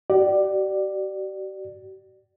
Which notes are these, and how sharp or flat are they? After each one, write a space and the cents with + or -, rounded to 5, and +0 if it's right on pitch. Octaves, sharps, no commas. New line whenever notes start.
G4 -45 D5 +15